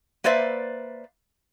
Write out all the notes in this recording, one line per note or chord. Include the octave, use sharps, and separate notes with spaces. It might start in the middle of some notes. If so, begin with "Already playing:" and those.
A#3 B4 C5 D5 E5